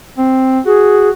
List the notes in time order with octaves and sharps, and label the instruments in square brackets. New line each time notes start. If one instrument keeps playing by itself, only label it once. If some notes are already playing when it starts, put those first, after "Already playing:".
[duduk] C4
[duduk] F#4 [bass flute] G#4